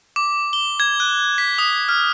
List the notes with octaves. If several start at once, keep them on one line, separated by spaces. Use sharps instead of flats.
D6
G7
G#6
F#6
B6
D#6
F6